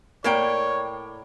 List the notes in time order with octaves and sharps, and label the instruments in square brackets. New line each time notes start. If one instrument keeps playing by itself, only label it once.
[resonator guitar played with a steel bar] A2 A#3 G5 [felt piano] A#4 D5 [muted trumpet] C#5